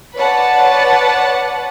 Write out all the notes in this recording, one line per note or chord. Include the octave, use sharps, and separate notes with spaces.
B4 C#5 D5 F#5 A5